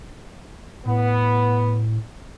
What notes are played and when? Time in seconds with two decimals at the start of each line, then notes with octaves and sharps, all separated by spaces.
0.85 A2 B3